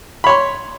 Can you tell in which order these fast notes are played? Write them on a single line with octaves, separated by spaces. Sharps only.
B5 C#5 C6